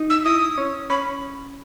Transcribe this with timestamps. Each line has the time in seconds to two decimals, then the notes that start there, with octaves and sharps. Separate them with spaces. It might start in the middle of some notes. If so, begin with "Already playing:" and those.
Already playing: D#4
0.10 E6
0.25 E4 D#6
0.58 C#4
0.90 C#4 B5